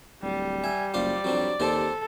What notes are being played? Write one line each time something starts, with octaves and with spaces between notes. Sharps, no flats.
D1 G3
E5 G#5
F#1 F4 C5 D5 F5
F2 F#3 C4 D4
D#2 C4 G4 A4 C5